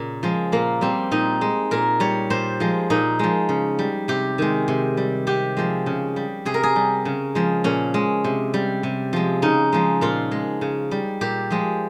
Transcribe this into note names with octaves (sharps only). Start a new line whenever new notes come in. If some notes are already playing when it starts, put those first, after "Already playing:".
Already playing: A#2 C#3
F3 G#3
A#2 A#3
G3 C4
A#2 D#4
G#3
A#2 A#4
G3 C#5
A#2 C5
F3 G#3
A#2 D#4
F3 G#3
C#3
G3
C3 G4
D#3 G#3
C3
G3
C3 G4
F3 G#3
C#3
G3
C3 G#4
A#4
G#4
G3
C#3
F3 G#3
A#2 C#4
G#3
C3
G3
C3
F3 G#3
C#3 D#4
F3 G#3
A#2 F4
G#3
C#3
G3
A#2 G4
F3 G#3